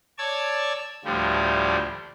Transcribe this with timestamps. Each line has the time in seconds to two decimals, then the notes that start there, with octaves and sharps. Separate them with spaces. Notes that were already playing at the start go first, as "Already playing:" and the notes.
0.18 C#5 D5 A5 E6 G#6
1.05 D2 A2 F3 G3